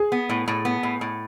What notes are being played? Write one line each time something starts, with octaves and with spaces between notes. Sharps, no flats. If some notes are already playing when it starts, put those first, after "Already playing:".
Already playing: G#4
B3
A2
A2
B3
A2
A2